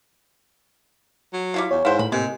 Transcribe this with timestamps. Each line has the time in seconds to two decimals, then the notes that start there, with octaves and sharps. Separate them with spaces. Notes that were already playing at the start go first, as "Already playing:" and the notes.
1.33 F#3
1.54 G3 E4 F4
1.71 E2 C#5
1.85 G#2 E4 C5 F5 F#5
1.99 A2 B5
2.12 C3 G#3 A#3